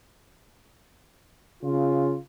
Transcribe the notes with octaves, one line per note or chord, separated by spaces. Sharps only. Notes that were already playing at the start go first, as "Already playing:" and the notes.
C#3 F4